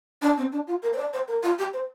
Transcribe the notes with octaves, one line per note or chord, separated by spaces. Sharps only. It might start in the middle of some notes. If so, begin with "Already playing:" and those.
D4
C4
D4
F4
A#4
C5
D5
C5
A#4
F4
G4
C5